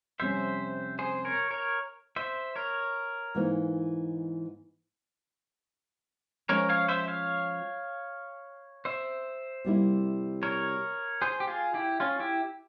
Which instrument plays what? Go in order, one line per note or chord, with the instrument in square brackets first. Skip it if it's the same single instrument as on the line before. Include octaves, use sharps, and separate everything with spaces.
[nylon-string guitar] F2 C3 G3 C#4 [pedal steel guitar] C5 E5
[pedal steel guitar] G#4 C5
A#4 C#5
A#4 C#5
C5 E5
A#4 C#5
[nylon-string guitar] G#2 E3 A#3
[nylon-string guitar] F3 G#3 C#4 F4 [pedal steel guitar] A#4 C#5
[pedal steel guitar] C#5 F5
C5 E5
C#5 F5
C5 E5
[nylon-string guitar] C3 G3 A#3 E4
[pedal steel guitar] A#4 C#5
G#4 C5
G4
F4 G#4
E4 G4
C#4 F4
E4 G4